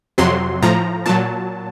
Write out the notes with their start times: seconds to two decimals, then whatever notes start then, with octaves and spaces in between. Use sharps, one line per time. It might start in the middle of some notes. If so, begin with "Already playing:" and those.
0.18 F2 C3 F#3 C6
0.62 A2 F3 A#5
1.06 A#2 F#3 A5